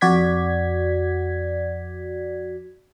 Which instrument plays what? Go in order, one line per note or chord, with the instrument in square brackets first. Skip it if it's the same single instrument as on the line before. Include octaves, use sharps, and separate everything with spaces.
[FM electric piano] F2 F#4 D5 G#6 B6